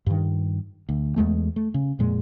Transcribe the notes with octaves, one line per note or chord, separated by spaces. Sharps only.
G2 D#3
D2
E2 G2 G#3 A3
A3
C#3
F2 A#2 G#3